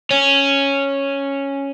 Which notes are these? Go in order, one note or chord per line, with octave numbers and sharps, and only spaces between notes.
C#4